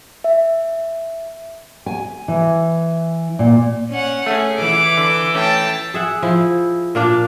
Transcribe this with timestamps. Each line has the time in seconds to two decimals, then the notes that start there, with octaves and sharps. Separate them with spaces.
0.24 E5
1.86 G#5
2.28 E3
3.39 A#2
3.89 C#4 F#5
4.26 A3 C#4 G#4
4.59 E3 D6
4.97 D3
5.35 A3 C#4 G5 A5
5.94 G#4 E5 F#5
6.22 F3 E4
6.95 A#2 A#3 D4